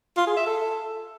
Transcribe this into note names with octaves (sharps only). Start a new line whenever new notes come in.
F4
G#4
E5
A4